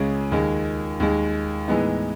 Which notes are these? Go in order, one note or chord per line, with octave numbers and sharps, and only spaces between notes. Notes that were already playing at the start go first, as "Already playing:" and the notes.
Already playing: C#2 C#3 G#3 C#4 G#4
D#2 D#3 G#3
D#2 D#3 G#3
A2 E3 G#3 B3 D#4